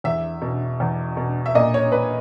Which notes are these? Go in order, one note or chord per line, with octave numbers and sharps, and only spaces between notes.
E2 E5
B2
E2
B2
E5
A#2 D#5
C#5
B4